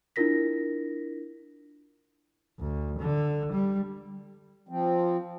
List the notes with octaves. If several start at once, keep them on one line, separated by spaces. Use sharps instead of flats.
D4 E4 F4 A#4 A#6 B6
D2
D3
G3
F3 C4